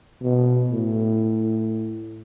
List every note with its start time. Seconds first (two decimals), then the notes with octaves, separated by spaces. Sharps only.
0.22 B2
0.71 A2